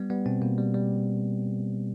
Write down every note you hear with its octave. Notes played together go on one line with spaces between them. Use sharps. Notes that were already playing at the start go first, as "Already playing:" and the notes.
Already playing: G3 B3
G3 B3
B2 C4
B2 A#3
G3
G3